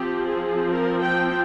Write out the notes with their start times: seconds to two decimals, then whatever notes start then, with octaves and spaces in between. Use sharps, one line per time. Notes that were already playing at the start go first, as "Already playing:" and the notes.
Already playing: F3 C4 G4
0.26 G#4
0.71 A#4
1.01 G5